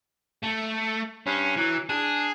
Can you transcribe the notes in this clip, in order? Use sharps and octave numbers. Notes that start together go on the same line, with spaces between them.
A3
G2 C#4
E3 F#3
D4 G#4